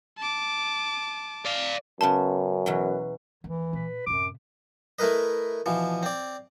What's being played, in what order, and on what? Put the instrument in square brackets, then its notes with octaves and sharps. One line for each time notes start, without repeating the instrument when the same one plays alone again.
[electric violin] A5 D6
[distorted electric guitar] D5 F5
[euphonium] F#2 [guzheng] C#3 B3 C6 [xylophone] A5
[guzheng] E2 B2 F#3
[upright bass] D#2 [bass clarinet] E3
[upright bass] A#2 [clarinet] B4
[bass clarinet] F#2 [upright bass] A2 C3 [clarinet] D6
[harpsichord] A3 E4 A#4 B4 D#5
B2 E3 F3
C4 D5